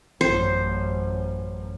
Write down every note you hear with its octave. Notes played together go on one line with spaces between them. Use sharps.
A1 F#2 C5